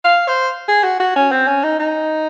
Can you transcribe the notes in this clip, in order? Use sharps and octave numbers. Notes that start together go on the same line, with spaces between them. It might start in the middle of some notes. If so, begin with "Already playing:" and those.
F5
C5
G#4
F#4
F#4
C#4
C4
C#4
D#4
D#4